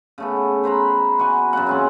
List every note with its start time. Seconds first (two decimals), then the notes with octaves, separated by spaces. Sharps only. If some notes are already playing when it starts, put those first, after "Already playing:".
0.18 C#3 A3 B3
0.63 B4 C5 A#5 B5
1.19 B2 F#4 F#5 G#5
1.53 F#2 C#3 A#3 F#5
1.67 E3 C4 C#4